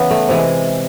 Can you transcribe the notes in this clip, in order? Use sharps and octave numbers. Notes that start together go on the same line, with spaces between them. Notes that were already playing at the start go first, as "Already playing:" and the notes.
Already playing: C#3 E3 B3
A3
C3 E3 G#3